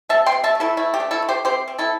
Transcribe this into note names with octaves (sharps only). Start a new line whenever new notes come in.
C3 E5 A5
G5 C6
C3
E5 A5
A3
E4 A4
A3 E4
G4
D4
E4 A4
A3
G4 C5
C4 G4 C5
C4
E4 A4